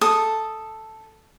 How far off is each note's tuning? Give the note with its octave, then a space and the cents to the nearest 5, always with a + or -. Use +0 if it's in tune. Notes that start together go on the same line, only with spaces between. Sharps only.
A4 +0 D#6 +0